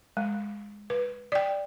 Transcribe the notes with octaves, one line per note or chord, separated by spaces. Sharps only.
G#3
B4
D5 G5